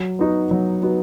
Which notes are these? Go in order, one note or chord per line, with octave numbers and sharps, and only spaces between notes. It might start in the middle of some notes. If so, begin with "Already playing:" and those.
Already playing: F#3
B3 D#4 F#4
F#3
B3 D#4 F#4